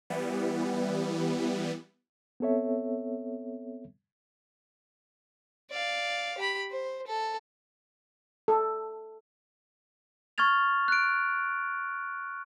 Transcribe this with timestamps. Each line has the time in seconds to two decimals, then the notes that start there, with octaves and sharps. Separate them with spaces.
0.10 E3 G3 B3
2.40 B3 C4 A4 C#5 E5
5.70 D5 F5
6.38 G4 B5
6.71 C5
7.07 A4
8.48 A4
10.38 C#6 F6 G#6 A6 F7
10.88 F#6 D7